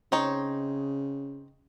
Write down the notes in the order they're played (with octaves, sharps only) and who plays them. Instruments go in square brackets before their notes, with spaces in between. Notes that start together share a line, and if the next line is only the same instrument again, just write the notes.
[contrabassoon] C#3 [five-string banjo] C4 D#4 C#5